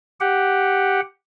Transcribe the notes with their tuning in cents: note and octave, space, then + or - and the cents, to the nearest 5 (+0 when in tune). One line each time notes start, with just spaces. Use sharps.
G4 +0 F#5 +0